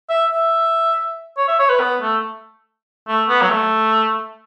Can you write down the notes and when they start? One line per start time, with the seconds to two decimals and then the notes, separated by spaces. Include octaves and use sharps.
0.10 E5
0.31 E5
1.38 C#5
1.48 E5
1.59 C#5
1.70 B4
1.80 B3
2.01 A3
3.08 A3
3.29 B3
3.42 F#3
3.50 A3